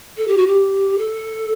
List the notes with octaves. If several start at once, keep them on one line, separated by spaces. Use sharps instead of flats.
A4
G4
F#4
G4
A4